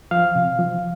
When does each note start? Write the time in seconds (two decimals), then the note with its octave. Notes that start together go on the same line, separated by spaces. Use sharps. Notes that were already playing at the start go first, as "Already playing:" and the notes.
0.11 F3 F5
0.35 C3
0.59 F3